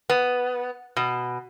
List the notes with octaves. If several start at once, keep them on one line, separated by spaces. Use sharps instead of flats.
B3
B2